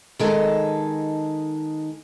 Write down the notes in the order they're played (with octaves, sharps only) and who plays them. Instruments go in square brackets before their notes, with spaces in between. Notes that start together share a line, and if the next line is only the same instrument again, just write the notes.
[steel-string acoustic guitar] D#3 G#3 A4